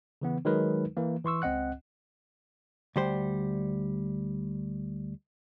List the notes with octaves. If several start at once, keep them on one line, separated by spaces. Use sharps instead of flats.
C#3 E3 B3
D#3 F#3 G#3 D#4 A#4 B4
E3 A#3
E3 C6 C#6 E6
C#2 C4 D#5 F#5 F#6
D2 G3 C5